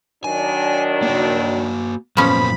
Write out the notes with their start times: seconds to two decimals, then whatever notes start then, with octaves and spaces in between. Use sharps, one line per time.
0.24 D#3 F#3 D4 G#5
1.03 A#3 F#4
2.17 F#2 A#2 F3 B3 C#4 B5